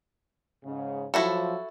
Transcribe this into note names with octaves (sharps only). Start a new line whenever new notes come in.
G#2 C#3
F3 F#3 E4 F#4 A4